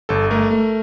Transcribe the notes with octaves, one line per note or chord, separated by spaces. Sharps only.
G1 A4
A3 A#4
A3